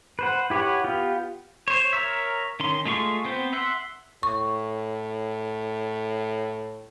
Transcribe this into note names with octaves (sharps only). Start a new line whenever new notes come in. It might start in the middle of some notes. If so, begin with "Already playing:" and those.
B4 C5 F#5
E4 G4 B4 C#5 F#5
B3 F4 G4
C5 C#5
A#4 C#5 E5
D#3 C#4 C6
G#3 A3 F4 C6 C#6
B3 C4 C5
E5 F#5 C6
A2 C#6